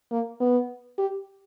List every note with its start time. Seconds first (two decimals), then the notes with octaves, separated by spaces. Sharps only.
0.11 A#3
0.40 B3
0.98 G4